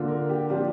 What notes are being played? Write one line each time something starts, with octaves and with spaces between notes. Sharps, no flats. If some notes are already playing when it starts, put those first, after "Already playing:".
Already playing: D3 A#3 F4
A#4
G4
F3 A#3 D4 F4 G4